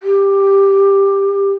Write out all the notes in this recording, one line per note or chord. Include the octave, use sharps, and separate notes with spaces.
G4